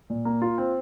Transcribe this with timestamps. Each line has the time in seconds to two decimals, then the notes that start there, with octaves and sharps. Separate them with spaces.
0.10 A#2
0.25 A#3
0.42 F4
0.58 C4